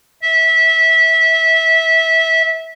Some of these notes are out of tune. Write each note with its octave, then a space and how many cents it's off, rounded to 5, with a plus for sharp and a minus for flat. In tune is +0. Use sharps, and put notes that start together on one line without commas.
E5 -20